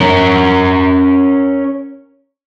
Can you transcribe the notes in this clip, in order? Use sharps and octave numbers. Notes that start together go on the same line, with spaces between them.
C#4 A#4